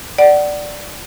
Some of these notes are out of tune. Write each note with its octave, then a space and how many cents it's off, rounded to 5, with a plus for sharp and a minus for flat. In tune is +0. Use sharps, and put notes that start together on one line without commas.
D5 +0 F#5 +30